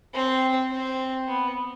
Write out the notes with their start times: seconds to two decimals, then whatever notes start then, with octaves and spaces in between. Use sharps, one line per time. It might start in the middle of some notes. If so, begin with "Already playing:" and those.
0.14 C4
0.71 C4
1.28 B3